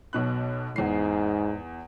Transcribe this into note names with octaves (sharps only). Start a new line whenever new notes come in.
B1 B2 F#6
E2 G#2 C7